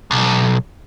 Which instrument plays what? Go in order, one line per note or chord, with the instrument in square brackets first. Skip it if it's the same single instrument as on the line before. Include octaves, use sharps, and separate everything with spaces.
[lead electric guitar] B1